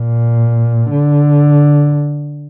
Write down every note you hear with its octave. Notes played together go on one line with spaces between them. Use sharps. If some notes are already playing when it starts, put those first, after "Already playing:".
Already playing: A#2
D3